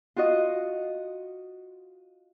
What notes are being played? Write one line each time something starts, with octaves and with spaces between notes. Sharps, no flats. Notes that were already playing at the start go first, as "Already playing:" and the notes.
F4 F#4 D#5